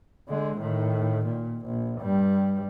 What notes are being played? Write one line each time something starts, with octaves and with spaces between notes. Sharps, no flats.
D3 G#3
A2 D#3
A#2
A#1
G2 G3